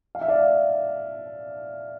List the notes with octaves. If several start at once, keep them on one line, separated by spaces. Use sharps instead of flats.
F5
E5
D5 F5